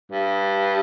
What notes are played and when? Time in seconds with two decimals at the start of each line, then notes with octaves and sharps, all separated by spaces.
0.11 G2